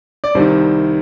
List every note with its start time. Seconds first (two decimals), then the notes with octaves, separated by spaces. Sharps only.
0.24 D5
0.35 C2 C3 D#3 C5